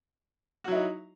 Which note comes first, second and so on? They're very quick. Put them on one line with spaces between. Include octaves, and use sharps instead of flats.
F#4 F#3 E4 D#4